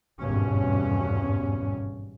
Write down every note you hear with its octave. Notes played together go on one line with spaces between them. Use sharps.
G#1 E2 G2 B2 C#4